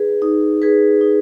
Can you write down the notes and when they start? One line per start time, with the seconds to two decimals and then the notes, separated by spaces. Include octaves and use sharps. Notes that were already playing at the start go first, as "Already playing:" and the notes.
Already playing: D#4 G#4 B4
0.22 D#4
0.62 G#4 B4
1.01 D#4